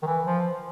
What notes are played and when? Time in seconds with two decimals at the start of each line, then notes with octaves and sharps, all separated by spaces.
0.02 D#3
0.06 E3
0.26 F3